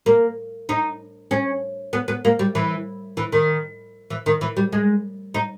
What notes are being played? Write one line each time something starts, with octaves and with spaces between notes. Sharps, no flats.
A#3
D#4
C#4
B3
B3
A#3
G3
E3
E3
D#3
E3
D#3
E3
G3
G#3
D#4